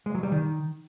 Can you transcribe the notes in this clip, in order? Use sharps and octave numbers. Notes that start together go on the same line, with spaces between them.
G#3
F#3
G3
D#3